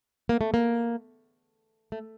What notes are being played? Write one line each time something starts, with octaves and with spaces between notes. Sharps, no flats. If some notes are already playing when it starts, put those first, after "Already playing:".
A#3
A3
A#3
A3